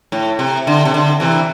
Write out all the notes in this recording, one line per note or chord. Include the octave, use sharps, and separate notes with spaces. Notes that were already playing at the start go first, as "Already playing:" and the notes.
A2
C3
D3
C3
D3
C3 E3